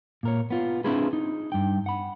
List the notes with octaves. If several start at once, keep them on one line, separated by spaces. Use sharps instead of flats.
A#2 A#4 C#5
B3 F4
C4 D4 E4 F4 G#4 B4
D#4
G2 G5
F#5 B5